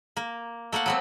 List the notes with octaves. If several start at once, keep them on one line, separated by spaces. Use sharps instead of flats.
A#3
A3 A#3 F5 F#5
F#3 B3 C4